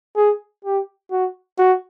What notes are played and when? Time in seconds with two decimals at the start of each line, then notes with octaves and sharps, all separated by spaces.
0.16 G#4
0.65 G4
1.11 F#4
1.58 F#4